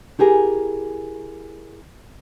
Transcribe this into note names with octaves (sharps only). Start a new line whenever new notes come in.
E4 G4 G#4 A#4